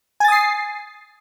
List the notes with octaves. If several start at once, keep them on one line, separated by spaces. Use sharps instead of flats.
G#5 D#6 A6 C7